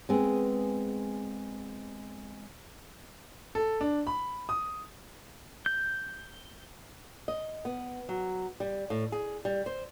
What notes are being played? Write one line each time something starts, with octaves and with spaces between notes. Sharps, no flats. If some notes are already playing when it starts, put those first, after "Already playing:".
G#3 B3 C4 G#4
A4
D4
B5
D#6
G6
D#5
B3
F#3
G3
A2
G#4
G3
C5